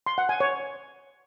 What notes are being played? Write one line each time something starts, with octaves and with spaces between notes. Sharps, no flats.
C6
F#5
G#5
C#5